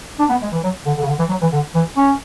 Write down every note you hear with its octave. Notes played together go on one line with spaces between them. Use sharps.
D4
B3
G#3
E3
F#3
D3
D3
C#3
D3
E3
F#3
E3
D3
E3
C#4